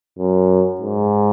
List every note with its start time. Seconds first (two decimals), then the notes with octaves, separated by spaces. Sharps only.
0.19 F#2
0.81 G#2